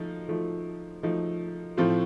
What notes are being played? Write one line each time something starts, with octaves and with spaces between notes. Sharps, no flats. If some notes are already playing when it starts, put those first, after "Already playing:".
Already playing: F3 A3 D#4
F3 A3 D#4
F3 A3 D#4
A2 F3 C4 F4 A4